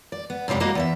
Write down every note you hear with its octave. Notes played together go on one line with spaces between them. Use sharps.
D5
B3
F#2 C3 F3 G3 G#3
G3 A#3 F#4 D#5
E2 D5 E5